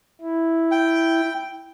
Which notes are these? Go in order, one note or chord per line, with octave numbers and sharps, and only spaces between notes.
E4
G5